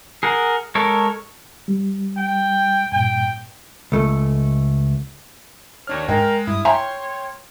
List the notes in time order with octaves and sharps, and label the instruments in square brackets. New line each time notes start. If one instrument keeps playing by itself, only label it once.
[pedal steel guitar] G#4 A#4 F#5
G#3 A4 A#4 C#5
[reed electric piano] G3
[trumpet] G5
[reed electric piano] G2 A#2 [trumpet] G5
[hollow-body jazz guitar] C#2 A3
[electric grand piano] D#2 D4 F6 [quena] C#5
[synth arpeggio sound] G#2 [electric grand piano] G#3 [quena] A#4 [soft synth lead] G5
[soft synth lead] G2 [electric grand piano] E4 [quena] D#6
[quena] C#5 [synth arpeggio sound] E5 G#5 A#5 [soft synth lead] G5 [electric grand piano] C6